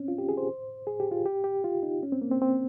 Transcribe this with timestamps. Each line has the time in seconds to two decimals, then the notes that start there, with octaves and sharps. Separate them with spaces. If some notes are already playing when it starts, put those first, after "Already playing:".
Already playing: C4 C#4
0.08 F4
0.18 G4
0.29 G#4
0.38 C5
0.87 G#4
1.00 G4
1.12 F4
1.26 G4
1.44 G4
1.64 F4
1.83 D#4
2.03 C#4
2.12 C4
2.22 A#3
2.31 C4
2.42 C4